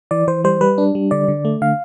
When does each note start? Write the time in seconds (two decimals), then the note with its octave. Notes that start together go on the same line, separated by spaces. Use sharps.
0.11 E3 D5
0.27 E3 C5
0.44 G3 C5
0.61 G3 B4
0.78 D4
0.95 G3
1.11 D3 D5
1.28 D3
1.45 A3
1.62 D3 F5